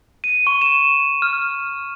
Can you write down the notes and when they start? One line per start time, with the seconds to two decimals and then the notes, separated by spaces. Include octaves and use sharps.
0.24 D#7
0.47 C#6
0.62 E7
1.22 F6